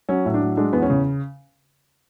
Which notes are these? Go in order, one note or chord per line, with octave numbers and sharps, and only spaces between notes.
F#3 C#4
A2
D4
F#3
G#3 D4
E2 B3
C#4
C#3